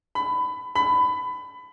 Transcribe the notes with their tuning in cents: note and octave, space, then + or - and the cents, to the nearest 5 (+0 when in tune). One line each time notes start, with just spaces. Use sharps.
B5 +20
B5 +20